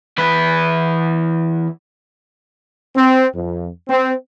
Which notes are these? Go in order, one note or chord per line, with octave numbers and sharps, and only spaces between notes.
E2 B4
C4
F2
C4